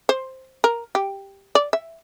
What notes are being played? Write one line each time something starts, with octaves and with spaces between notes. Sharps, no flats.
C5
A#4
G4
D5
E5